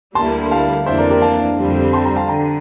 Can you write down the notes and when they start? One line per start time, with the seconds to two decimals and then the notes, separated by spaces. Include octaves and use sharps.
0.15 D2 D3 G3 A#3 E4 A5 C6
0.51 F5 A5
0.86 F2 E3 A#3 D4 C5 E5
0.98 A#4 D5
1.10 G4 A#4
1.22 F5 A5
1.58 F2 D3 G3 C4
1.93 A5 C6
2.05 G5 A#5
2.16 F5 A5
2.28 D3 G5 A#5